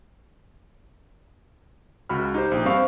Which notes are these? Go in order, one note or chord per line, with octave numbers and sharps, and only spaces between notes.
C#2 F#4 B5 F6
D#4 G4 C5
A#1
G2 C4 C5 F5 C#6